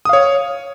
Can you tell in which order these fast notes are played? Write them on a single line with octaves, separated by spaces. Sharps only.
D#6 F5 C#5